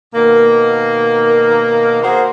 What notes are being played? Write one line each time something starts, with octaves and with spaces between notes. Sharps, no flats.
B2 D#3 A#3
F#4 G#4 A#4 C5